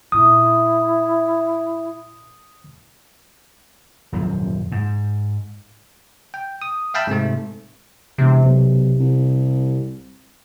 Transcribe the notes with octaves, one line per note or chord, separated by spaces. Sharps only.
A#2 D4 E4 D#6
D#1 F#2 F3
G#2
G5
D#6
E5 F5 G5 A5 B5 E6
G#2 C3 A3
E1 C3
B1
C2